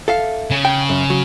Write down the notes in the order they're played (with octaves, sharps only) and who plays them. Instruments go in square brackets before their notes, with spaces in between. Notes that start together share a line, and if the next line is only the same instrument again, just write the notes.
[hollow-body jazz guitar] A4 E5 F5
[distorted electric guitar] C#3
[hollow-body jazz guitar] G5
F#2
F#3